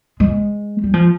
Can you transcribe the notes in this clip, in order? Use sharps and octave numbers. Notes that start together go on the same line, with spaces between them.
G#3
G3
F3